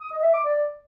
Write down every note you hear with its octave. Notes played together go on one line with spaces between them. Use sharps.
D#6
D#5
E5
D6
D5